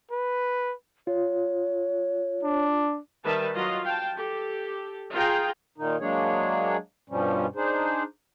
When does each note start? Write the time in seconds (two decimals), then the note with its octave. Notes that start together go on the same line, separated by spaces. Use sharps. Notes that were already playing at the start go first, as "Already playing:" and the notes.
0.11 B4
1.07 F4 C#5
2.43 D4
3.24 D#3 G3 B4 E5 A5
3.54 F#3 F4 D#5
3.84 F5 G5 A5
4.14 G4 A4
5.13 F4 G#4 G5 A#5
5.78 A#2 D#3 D#4
6.01 F#3 G#3 A#3 D4 G#4 C#5
7.10 G2 B2 F3 G3 C#4
7.56 D4 D#4 G#4 C5